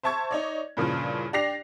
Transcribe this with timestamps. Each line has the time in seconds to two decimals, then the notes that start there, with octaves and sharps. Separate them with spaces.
0.03 C5 E5 A5 C#6 G#6
0.31 D#4 C#5 D5
0.77 G2 A#2 C#3 E3 F3
1.33 D4 G4 D5 A#6 C7 F7